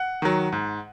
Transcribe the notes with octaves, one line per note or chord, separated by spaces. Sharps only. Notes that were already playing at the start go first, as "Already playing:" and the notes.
Already playing: F#5
D#3 F#3
G#2